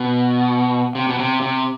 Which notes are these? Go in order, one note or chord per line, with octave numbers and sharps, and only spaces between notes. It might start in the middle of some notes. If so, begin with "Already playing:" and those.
Already playing: B2
C3
B2
C3
C3